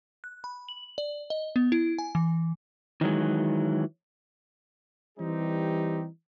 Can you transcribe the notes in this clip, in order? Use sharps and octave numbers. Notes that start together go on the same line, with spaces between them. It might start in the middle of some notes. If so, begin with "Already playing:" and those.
F#6
B5
F#7
D5
D#5
B3
E4
G#5
E3
D#3 E3 F#3 G#3
E3 G3 C4 D#4 G4